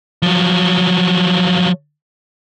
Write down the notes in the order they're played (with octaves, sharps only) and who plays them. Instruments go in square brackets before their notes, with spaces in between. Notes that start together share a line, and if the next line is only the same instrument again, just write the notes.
[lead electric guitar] F3 F#3